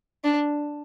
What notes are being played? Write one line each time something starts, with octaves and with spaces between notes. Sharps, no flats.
D4